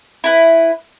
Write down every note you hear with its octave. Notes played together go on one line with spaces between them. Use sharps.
E4 B4